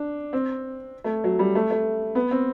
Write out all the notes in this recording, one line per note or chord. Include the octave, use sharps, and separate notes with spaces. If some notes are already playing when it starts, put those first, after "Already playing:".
Already playing: D4
C4
A3
F#3
G3
A3
A3
B3
C4